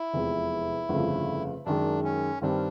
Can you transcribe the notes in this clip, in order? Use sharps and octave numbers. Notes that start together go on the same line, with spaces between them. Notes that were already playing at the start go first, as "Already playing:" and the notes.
Already playing: E4
F1 E2 C3 F3 G#3
G1 F2 C#3 F3 A3
F#2 D#3 G#3 D4
C#4
G2 D#3 G3 C4 D4